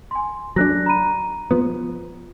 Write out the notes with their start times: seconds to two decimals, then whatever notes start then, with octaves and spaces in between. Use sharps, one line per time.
0.11 G#5 C6
0.56 F#3 C4 D4 A4 F#6 A#6
0.86 A#5 B5 D#7
1.51 F3 B3